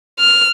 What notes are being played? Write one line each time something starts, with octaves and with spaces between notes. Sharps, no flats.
F6